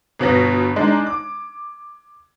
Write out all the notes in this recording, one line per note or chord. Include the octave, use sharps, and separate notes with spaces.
G1 B2 B3 A#6
G#3 D4 D#4
D6